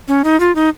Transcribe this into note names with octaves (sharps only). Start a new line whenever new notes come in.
C#4
D#4
F4
D#4